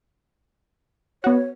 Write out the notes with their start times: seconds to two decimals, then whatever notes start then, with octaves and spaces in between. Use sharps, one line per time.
1.24 B3 F#4 C#5